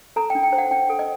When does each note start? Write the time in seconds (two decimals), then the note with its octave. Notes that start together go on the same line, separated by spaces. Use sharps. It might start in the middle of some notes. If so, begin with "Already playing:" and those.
0.16 A4 A#5
0.30 G5
0.35 D4
0.43 G5
0.53 C5
0.58 F#5
0.71 D4 G5
0.89 A4
0.99 D#5